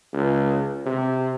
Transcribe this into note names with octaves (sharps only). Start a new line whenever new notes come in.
C#2
C3